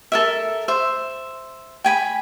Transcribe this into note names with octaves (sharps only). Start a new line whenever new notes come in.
A4 A#4 E5
C5 E5
G5 G#5 B5